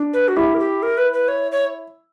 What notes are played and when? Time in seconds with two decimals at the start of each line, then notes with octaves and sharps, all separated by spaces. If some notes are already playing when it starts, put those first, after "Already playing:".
Already playing: D4
0.13 B4
0.28 F#4
0.36 E4 G4
0.54 A#4
0.59 G4
0.83 A#4
0.97 B4
1.13 B4
1.28 C#5
1.52 C#5